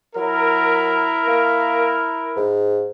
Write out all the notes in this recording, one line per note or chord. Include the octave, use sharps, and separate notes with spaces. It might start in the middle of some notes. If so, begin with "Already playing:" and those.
F#3 E4 A#4
A#3
G#2